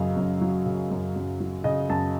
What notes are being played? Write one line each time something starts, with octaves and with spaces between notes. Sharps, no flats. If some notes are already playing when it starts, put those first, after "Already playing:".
Already playing: F#2 C#3 F#3 D#5 F5
F#2
F#3
C#3
F#2
F#2
F#3
C#3 D#5
F#2 A5